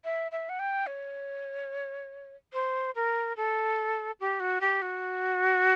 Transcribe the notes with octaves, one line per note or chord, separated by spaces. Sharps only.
E5
E5
F#5
G5
C#5
C5
A#4
A4
G4
F#4
G4
F#4